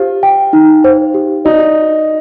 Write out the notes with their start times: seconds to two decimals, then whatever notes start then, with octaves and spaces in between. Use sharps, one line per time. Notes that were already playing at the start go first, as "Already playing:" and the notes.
Already playing: F4 G4 C5
0.23 G5
0.53 D#4
0.84 C5
1.14 G4
1.45 D#4 D5